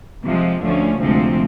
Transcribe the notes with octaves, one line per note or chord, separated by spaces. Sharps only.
C3 F3 G#3
D2 D3 F3 A3 C#4
D2 C3 F3 G#3 C4